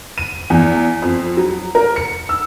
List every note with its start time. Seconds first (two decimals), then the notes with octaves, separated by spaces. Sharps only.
0.18 D#7
0.50 E2
1.02 F2
1.37 F#3
1.75 A#4
1.96 C#7
2.29 E6